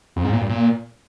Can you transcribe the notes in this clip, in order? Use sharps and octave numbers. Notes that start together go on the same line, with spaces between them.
F2
G#2
A#2
G2
A#2